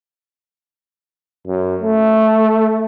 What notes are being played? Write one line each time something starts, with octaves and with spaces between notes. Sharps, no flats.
F#2
A3